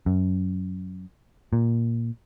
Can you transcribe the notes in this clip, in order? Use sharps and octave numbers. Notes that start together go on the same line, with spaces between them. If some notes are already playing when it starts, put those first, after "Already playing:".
F#2
A#2